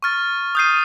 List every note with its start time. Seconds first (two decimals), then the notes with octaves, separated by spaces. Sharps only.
0.03 C#6 F6 A6
0.55 D#6 G6 C7 D#7